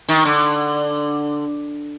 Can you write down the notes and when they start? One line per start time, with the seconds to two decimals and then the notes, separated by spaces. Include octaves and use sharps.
0.09 D#3
0.25 D3